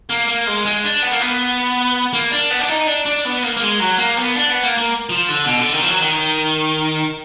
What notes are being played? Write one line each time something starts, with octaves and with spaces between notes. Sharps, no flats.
A#3
A#3
G#3
G#3
D4
B3
A#3
B3
A#3
D4
B3
D4
D#4
D4
D4
B3
A#3
A#3
G#3
F#3
A#3
B3
D4
B3
A#3
A#3
F3
D3
B2
D3
D#3
F3
F#3
D#3